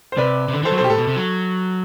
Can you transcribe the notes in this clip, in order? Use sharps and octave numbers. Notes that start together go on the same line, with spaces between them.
C5
C3 B4 D5
C3
D3
E3 A4 C5
F#3
B2 A4 C5
G4
A2 A4
B2
C3
F#3